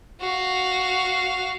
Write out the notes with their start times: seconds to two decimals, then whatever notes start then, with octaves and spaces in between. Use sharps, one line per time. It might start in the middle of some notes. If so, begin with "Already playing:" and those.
0.20 F#4 F5